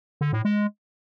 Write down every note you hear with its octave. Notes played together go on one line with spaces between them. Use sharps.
D3
A2
G#3